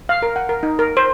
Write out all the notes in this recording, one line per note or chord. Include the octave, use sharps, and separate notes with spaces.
F5
A#4
F#5
A#4
D#4
A#4
C5